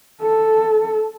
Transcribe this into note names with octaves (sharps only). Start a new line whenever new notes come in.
A4